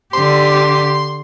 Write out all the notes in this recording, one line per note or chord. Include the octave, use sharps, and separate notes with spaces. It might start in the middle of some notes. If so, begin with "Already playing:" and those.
D3 G4 C6